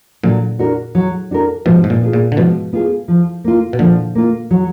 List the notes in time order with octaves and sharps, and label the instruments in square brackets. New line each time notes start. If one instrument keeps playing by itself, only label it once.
[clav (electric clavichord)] A#2 D3 [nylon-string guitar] F#3
[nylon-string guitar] D4 F#4 A#4
F#3
D4 F#4 A#4
[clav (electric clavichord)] G#2 B2 [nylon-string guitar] F3
[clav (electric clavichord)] G#2
A#2
[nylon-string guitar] B3 F4 G#4
[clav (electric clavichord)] A#2
D3
[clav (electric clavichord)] G#2 B2 [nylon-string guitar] F3
[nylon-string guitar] B3 F4 G#4
F3
A#3 F4
[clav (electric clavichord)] B2
[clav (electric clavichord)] A#2 D3 [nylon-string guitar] F3
[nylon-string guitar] A#3 F4
F#3